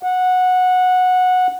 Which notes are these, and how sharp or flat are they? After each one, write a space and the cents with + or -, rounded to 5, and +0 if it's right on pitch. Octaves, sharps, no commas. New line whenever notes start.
F#5 -15